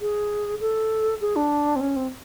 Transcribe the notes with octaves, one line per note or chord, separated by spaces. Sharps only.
G#4
A4
G#4
D4
C4
C#4
C4